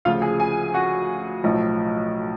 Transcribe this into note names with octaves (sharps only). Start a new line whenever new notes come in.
D2 C#3 F3 F4 F5
G#4 G#5
G#4 G#5
F#4 F#5
B1 A2 F3